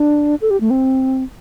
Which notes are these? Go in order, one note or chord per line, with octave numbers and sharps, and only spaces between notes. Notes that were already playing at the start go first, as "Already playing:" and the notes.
Already playing: D4
A4
G4
A3
C4